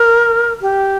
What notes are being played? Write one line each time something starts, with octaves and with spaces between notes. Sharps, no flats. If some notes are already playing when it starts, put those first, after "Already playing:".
Already playing: A#4
G4